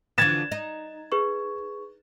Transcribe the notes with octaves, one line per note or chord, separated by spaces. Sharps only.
D3 E3 F3 G#6 A6 E7
D#4
G#4 B4 C#6